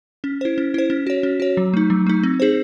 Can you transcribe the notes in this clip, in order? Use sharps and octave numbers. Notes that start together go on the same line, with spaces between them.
C#4
E4 C5
C#4
E4 C5
C#4
F#4 C#5
C#4
F#4 C#5
F#3
A3 D#4
F#3
A3 D#4
C4
D#4 G#4 C5